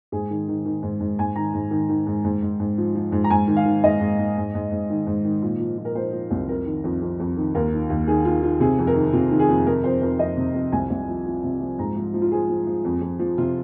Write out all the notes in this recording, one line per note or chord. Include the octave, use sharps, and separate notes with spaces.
G#2 G#4
D#3
D#3
D#3
G#2
G#2
G#2 G#5
D#3 A#5
G#2
D#3
D#3
G#2
G#2
G#2
G#2
F3
F3
G#2
A#5
G#2 G#5
D#3
F5
D#3
G#2 D#5
G#2
G#2
G#2
G#2
G#2
D#3
G#2
D#3
A#2
F3
A#2
A#4
F3 C5
F3
C2
F2 A#4
D#3
F2
F2
F2
D#3
D#2 A#4
D#3
D#2
D#3 G#4
D#3 F4
D#3 F4
C3 G#4
F2
A#4
D#3
C3 F4
D#3
G#4
F2
C3 A#4
F2 C5
F2 A#4
F2 D#5
C3
F2
C2 G#5
C2
F3
F3
C3
F3
G#2 A#5
F3
F3
F4
F3 G#4
F3
F3
F2
F2
F3
C3 F4